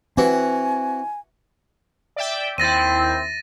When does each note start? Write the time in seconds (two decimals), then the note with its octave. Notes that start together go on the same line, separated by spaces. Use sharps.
0.17 E3 C4 F#4 G#5
2.16 D5 E5 G5
2.58 D#2 C4 E4 A6 A#6 D#7